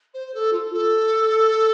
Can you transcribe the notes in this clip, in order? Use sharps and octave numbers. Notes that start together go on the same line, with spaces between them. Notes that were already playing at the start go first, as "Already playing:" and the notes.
C5
A4
F4
A4